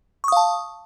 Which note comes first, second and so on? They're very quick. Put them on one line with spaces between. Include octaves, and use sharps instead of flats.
C#6 D#6 F5 A5